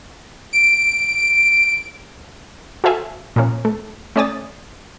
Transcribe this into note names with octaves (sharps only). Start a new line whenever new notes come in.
D7
F#4 A4 C5 E5 F5 G#5
A#2 F3 A#3 C#4
A3
A3 C#4 D5 G#5 D#6 A6